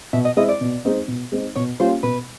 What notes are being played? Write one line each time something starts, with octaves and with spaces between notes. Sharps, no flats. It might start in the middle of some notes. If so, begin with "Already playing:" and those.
B2 E5
D#5
G#3 C4 E4 D#5
D5
B2
G#3 C4 D#4
B2
G#3 C4 D#4
B2 C#5
G3 A#3 C#4 F4 C5
B2 B4